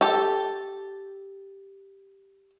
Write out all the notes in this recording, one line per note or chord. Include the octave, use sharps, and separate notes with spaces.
G4 A4